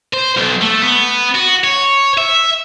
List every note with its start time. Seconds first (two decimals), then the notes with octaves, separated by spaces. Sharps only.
0.14 C5
0.37 B1
0.62 A3
0.82 B3
1.35 F#4
1.64 C#5
2.18 E5